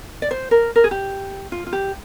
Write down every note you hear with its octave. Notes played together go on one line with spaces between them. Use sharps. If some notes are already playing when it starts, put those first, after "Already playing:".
D5
C5
A#4
A#4
G#4
G4
F4
F4
G4